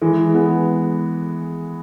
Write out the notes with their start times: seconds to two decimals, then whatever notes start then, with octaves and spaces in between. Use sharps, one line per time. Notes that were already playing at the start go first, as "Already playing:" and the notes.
0.02 E3 G#3
0.34 G#3 B3